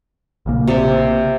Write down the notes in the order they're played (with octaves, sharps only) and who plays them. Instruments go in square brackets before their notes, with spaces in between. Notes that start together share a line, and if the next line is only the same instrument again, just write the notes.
[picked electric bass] A#1 C#3 A#3
[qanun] C3 G4 D5